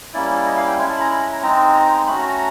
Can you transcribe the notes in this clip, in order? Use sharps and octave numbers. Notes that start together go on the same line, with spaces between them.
G3 A#3 C#4 E4 D5
D#5
F5
G5
G#3 C#4 E4 G#5
A5
B5
A#5
B5
A#5
A#5
G#3 C4 D#4 A#5
A#5
A3 C#4 F#4 B5
A#5
A#5